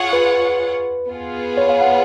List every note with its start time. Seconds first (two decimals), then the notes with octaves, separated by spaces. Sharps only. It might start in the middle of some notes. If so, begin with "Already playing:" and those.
Already playing: F4 G#4 C#5 F#5
0.13 B4
1.09 B3 F4 G#4
1.57 C#5
1.69 F5
1.81 F#5